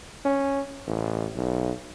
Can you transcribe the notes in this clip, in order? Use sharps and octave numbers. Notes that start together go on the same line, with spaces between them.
C#4
A1
B1